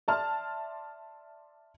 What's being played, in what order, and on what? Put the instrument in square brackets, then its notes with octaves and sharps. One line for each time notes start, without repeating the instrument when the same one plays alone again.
[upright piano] D5 E5 A5 C6 F6